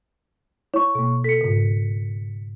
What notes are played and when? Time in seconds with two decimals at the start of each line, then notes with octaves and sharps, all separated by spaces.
0.74 E4 C#5 C#6
0.95 B2 A#3
1.24 A4 B6 C#7
1.41 G#2 C#3